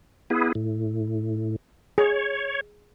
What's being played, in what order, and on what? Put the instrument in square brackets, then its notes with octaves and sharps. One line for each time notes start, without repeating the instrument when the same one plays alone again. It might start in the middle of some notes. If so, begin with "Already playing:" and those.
[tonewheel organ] B3 E4 G#4
A2
[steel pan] G#4 [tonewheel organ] C#5